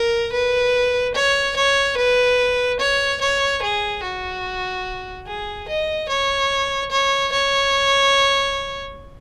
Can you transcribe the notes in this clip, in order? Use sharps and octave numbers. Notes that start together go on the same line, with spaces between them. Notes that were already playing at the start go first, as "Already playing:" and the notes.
Already playing: A#4
B4
C#5
C#5
B4
C#5
C#5
G#4
F#4
G#4
D#5
C#5
C#5
C#5